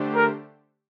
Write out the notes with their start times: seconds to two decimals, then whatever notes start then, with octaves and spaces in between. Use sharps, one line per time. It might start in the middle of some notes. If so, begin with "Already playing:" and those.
Already playing: D3 A3 D4 G4 C5
0.15 A#4